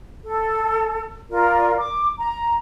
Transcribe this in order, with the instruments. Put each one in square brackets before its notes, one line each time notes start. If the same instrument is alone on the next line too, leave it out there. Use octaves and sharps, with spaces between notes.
[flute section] A4
F4 A#4 D5
D6
A#5